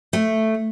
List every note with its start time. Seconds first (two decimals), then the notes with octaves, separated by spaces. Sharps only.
0.13 A3